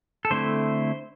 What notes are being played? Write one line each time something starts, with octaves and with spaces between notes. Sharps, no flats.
A4
D3 A3 C4 E4 C5